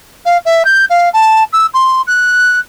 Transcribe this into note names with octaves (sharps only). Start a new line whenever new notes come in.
F5
E5
G6
F5
A5
E6
C6
F#6